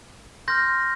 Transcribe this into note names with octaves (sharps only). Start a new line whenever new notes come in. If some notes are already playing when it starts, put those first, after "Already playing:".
C6 F6 G6 A#6